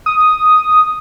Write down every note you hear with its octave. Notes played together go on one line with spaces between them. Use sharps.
D#6